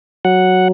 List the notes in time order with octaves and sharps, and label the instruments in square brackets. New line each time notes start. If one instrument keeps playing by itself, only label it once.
[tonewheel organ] F#3 F#5